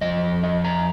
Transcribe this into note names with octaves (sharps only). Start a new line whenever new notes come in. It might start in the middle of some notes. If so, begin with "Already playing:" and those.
F2 F3 D#5
D#5
A#5